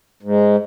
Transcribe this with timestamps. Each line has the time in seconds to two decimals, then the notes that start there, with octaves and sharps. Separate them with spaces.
0.23 G#2